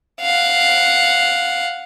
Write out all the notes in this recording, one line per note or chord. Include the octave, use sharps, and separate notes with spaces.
F5 F#5